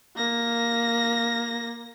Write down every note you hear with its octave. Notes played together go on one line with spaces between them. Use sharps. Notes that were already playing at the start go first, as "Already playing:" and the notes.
A#3 A#6